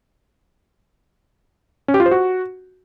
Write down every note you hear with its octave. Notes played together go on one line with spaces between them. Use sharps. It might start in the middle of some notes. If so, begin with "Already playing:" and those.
C#4
G4
F4
C5
F#4